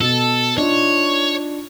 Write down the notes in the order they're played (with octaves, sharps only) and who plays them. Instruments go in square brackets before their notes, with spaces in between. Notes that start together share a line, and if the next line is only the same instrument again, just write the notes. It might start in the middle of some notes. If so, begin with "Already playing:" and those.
[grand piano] B2 [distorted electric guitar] A4
[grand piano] D4 D#4 F4 [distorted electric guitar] C#5